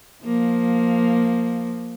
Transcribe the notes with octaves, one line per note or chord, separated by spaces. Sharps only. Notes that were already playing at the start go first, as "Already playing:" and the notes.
F3 A#3